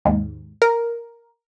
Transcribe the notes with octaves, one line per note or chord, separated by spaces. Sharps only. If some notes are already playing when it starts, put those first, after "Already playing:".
D#2 G#2
A#4